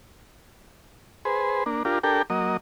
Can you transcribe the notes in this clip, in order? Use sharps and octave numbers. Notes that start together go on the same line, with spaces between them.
G#4 B4 C5
A#3 D4
D4 F4 G4 A#4
D4 G4 A4 A#4 G5
F#3 A#3 D#5